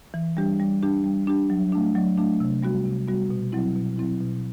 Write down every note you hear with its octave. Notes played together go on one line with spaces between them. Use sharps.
E3
G3 D4 G4
G3
D4 G4
G3
D4 G4
F#3
A3 D4
F#3
A3 D4
C3
G3 B3 F#4
C3
G3 B3 F#4
B2
F#3 C4 E4
B2
F#3 C4 E4
B2